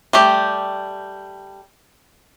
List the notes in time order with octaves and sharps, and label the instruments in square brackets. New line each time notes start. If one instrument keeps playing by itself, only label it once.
[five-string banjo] G3 A3 G4